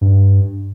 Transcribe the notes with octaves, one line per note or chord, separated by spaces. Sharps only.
G2